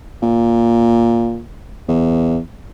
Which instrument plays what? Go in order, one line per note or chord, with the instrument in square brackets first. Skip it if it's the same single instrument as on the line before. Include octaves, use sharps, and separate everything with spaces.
[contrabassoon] A#2
E2